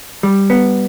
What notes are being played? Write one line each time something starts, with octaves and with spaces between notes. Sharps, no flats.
G3
B3